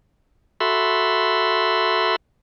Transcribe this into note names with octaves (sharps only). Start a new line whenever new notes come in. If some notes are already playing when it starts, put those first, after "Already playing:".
F#4 A4 E5 B5 C6